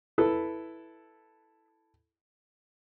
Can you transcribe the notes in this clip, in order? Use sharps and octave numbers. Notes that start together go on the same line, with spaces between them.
E4 A4 B4